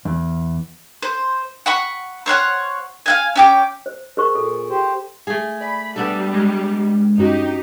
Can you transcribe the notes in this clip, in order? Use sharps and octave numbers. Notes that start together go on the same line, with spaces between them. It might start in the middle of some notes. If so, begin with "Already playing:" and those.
E2
C5
F#5 B5 C#6
C5 C#5 F#5 F6
F5 F#5 G#5
C#4 G5 D6
C5
G#4 A#4 C5 C#6
A#2 A4
G4 C5
A3 G#4
D5 G#5 B5
G3 B3 D4 A4
G#3
G2 C#4 D#4 F#4 G4